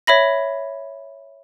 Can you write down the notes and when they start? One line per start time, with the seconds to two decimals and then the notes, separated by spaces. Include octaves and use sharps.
0.07 C#5 E5 B5 A#6